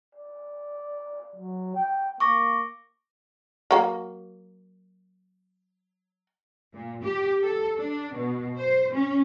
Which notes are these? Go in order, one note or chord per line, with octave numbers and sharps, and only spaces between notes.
D5
F#3
G5
A#3 C#6 D6 A#6
F#3 A#3
A#2
G4
A4
D4
B2
C5
C#4